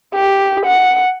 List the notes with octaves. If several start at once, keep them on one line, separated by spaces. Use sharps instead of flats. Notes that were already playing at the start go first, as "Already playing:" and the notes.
G4
F#5